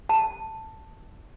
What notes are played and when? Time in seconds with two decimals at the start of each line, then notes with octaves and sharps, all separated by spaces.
0.09 A5